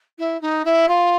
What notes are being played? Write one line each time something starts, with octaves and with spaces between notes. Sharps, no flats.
E4
D#4
E4
F4